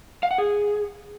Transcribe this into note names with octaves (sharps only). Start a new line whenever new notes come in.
F5
F#5
G#4